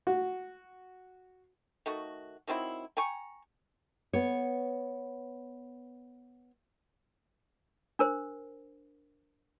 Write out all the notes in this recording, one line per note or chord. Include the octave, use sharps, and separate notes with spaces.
F#4
D#3 A3 F#4
D#3 F#3 C4 E4
G5 G#5 A#5 C#6
B3 C#5
D4 A#4 C5